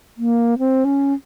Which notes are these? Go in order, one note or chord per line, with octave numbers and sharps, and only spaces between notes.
A#3
C4
C#4